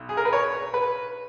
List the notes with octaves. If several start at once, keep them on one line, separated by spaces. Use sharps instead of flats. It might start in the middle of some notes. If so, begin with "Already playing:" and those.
Already playing: B1
G#4
A#4
B4
C#5
B4